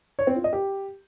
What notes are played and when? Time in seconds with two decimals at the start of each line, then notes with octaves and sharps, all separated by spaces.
0.19 C#5
0.27 C4
0.36 F4
0.44 D#5
0.53 G4